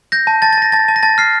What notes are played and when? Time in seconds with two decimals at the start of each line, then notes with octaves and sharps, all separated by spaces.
0.12 G6 A#6
0.27 A5
0.42 A5 A6
0.53 A6
0.58 A5 A#6
0.72 A5 A6
0.88 A5
0.96 A#6
1.03 A5 A6
1.18 F6 C7